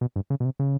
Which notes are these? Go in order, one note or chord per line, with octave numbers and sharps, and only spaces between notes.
B2
G2
C#3
B2
C3
C#3